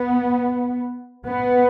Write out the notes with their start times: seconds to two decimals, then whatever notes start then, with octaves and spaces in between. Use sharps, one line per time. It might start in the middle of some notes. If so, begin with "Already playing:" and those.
Already playing: B3
1.26 B3